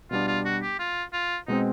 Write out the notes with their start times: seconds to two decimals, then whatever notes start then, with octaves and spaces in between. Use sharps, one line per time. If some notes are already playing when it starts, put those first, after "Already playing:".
0.11 B2 G3 B3 D4 F4
0.28 F4
0.45 F#4
0.63 G4
0.79 F4
1.13 F4
1.48 B2 G#3 C4 D#4